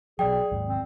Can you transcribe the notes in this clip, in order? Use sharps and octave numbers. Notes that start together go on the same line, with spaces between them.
B2 F#3 G#4 D5 G5
D#2 G#2
C4